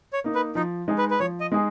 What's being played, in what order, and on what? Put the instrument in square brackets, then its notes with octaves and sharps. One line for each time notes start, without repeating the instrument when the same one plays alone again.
[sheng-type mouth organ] C#5
[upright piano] A#3 D#4
[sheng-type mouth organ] B4
[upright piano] F3 [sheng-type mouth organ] D#4
[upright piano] G#3 D#4 G#4
[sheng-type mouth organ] B4
B4
[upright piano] F3 [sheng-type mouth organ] C#5
[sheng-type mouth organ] D#5
[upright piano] G#3 D#4 G#4